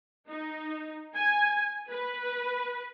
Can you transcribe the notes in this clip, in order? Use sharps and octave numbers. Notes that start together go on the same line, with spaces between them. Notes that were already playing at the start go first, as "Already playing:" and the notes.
D#4
G#5
B4